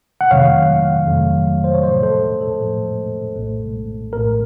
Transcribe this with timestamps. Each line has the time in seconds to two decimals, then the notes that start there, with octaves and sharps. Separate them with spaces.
0.21 F#5
0.31 F2 C3 D#3 F#3 A3 C#5 F5
1.07 F2 C3 D#3 F#3 A3
1.64 C5
1.74 C#5
1.83 A2 F3 A3 C5 D#5
2.03 A4 C5
2.41 A4
2.60 A2 F3 A3
3.36 A#1 A2 A3
4.13 A#1 A2 A3 A#4